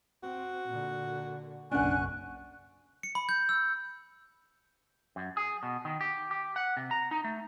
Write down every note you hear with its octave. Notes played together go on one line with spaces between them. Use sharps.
C4 F#4
A#2 D3
F#1 B1 C#4 D4 F#5 G#5 C#6 F#6
C#7
B5
G6
E6
F#2
G#4
B2
D#3
G4
G4
F#5
C3
A#5
D#4
A3